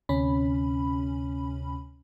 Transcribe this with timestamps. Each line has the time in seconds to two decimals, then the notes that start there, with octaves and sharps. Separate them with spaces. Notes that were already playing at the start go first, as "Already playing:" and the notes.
0.09 D2 C3 C#4 B5